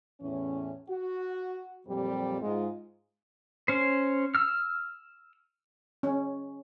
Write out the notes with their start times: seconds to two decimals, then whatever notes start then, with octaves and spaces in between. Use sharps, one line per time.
0.20 E2 A2 E3 C#4
0.88 F#4
1.86 F2 A#2 F#3 G3 C4 G4
2.40 G#2 G#3 F4
3.68 C#4 C5
4.35 E6 F6
6.03 C#4